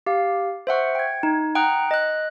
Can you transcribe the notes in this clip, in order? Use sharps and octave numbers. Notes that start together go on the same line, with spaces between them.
G4 F5
C5 E5 F#5 C#6
G5 G#6
D#4
F#5 G5 A#5 D#6 F#6
D#5 F#6